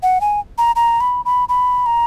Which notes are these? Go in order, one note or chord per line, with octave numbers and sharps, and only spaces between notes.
F#5
G#5
A#5
A#5
B5
B5
B5
A#5